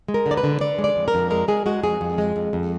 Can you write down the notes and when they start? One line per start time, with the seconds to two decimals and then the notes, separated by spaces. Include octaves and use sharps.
0.08 G#3
0.14 A#4
0.26 D3
0.31 D5
0.37 B4
0.43 D3
0.61 D3 D5
0.78 G#3
0.84 D5
0.96 F2
1.08 A#4
1.14 F2
1.30 G#3 A#4
1.48 G#3 G#4
1.66 G#3 F#4
1.83 F2 G#4
2.01 F2
2.18 G#3
2.36 F2
2.53 F2